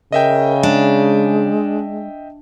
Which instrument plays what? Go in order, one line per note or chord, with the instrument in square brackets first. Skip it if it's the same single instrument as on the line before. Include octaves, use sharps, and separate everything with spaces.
[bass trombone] C#3 [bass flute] A#4 [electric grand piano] D#5 E5 G5
[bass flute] G#3 [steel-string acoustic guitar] D4